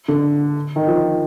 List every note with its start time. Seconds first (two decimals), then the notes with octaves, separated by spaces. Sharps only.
0.08 D3
0.76 D#3
0.87 F3